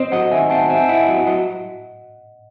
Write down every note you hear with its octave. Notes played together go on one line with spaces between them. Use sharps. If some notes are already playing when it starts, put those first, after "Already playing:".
Already playing: C4 C5 D#5
F#3 D#5 F#5
D#3 E5 G#5
C4 F#5 A5
C4 E5 G#5
E4 D#5 F#5
F#3
F#3 D#5 F#5